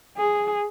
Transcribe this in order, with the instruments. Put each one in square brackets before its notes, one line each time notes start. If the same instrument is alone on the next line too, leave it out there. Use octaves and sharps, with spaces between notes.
[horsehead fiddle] G#4